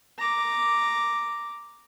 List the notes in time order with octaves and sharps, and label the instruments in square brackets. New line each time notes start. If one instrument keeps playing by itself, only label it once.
[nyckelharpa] A#5 D6